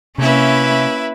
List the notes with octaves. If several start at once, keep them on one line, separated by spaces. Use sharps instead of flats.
C3 A#3 C#4 E4 B4 E5